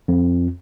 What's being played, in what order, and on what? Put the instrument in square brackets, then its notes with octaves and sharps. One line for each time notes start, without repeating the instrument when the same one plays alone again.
[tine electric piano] F2